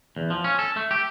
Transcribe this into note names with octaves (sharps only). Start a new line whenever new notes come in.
E2
F3
C#4
A4
A3
G4